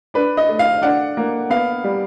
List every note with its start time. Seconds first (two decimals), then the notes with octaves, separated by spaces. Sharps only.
0.14 D4 B4
0.37 D#5
0.49 A3
0.59 F5
0.82 D4 F#5
1.17 A#3
1.50 B3 F5
1.84 G3